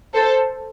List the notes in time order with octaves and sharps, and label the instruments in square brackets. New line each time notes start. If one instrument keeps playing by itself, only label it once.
[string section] A4 C5